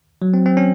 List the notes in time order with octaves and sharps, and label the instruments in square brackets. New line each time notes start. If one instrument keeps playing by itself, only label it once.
[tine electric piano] F#3
C4
C4
C#4